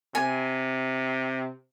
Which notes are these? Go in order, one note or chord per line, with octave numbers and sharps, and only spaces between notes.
C3 G#5